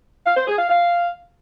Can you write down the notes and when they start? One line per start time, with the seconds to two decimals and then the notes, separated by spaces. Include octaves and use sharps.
0.26 F5
0.37 C5
0.48 G#4
0.58 F5
0.69 F5